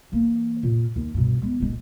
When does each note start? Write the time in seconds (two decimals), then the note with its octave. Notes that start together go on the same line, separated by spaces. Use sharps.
0.12 E3 A#3
0.63 F2 A#2
0.96 D#2
1.14 G2 B2
1.42 G#3 B3
1.60 D#1 G#3